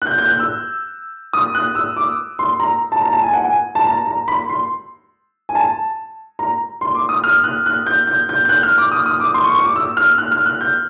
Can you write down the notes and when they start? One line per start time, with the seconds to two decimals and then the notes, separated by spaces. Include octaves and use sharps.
0.02 F#6
0.07 G6
0.18 G6
0.28 F#6
0.39 E6
1.33 D#6
1.55 F#6
1.75 E6
1.96 D6
2.39 C6
2.60 A#5
2.92 A5
3.02 A#5
3.13 A5
3.23 G#5
3.33 F#5
3.44 G#5
3.75 A5
3.86 A#5
4.07 A#5
4.28 B5
4.49 C6
5.49 G#5
5.55 A5
6.39 A#5
6.81 C6
6.95 D6
7.09 D#6
7.24 F6
7.44 F#6
7.66 F#6
7.86 G6
8.07 G6
8.29 G6
8.45 G6
8.49 F#6
8.63 F6
8.78 D6
8.92 D#6
9.06 D#6
9.20 D6
9.34 C6
9.44 C#6
9.55 C#6
9.65 D6
9.76 E6
9.97 F6
10.18 F#6
10.32 F6
10.46 F#6
10.61 G6